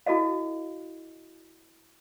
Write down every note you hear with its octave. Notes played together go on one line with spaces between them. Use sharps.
E4 F#4 A4 D#5 F5